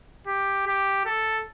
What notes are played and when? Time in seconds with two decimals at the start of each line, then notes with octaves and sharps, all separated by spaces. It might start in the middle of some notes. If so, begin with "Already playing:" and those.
0.27 G4
0.66 G4
1.06 A4